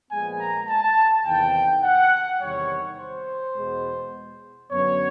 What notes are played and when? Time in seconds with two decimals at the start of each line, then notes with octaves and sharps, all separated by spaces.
0.11 A#2 F3 G#3 B3 G#5
0.39 A#5
0.68 A5
1.26 E2 C3 D#3 G5
1.83 F#5
2.40 E2 C3 D#3 G3 C#5
2.98 C5
3.55 E2 B2 G#3 B3
4.69 F#2 D3 F#3 B3 C#5